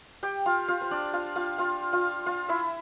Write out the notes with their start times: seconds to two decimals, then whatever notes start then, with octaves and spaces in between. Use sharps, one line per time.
0.23 G4 G5
0.46 F4 F5
0.68 F4 F5
0.81 C5
0.91 D4 D5
1.13 F4 F5
1.36 F4 F5
1.58 F4 F5
1.93 F4 F5
2.26 F4 F5
2.49 E4 E5